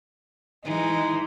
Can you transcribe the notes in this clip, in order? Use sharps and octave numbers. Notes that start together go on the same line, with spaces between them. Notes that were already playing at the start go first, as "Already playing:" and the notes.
E3 G#3 D#4